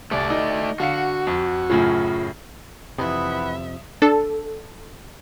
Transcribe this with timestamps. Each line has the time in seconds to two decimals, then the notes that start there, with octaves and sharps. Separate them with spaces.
0.11 C2 A3 D5
0.30 D#4
0.80 D3 F#4 F5 C#7
1.27 F2
1.70 F#2 A2 C#3 F4
2.98 F2 C3 E3 E5 F#5 B5 D#6
4.02 D4 A4